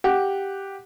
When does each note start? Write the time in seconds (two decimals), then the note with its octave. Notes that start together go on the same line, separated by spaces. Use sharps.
0.04 G4 F#5